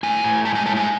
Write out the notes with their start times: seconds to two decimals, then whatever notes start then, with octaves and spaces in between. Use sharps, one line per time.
0.03 A2 G#5
0.24 A2
0.45 G#3 A5
0.55 G#5
0.66 A2 A5
0.76 G#5